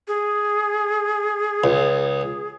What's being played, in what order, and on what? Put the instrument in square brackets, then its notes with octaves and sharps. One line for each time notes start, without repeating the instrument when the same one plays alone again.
[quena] G#4
[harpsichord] C#2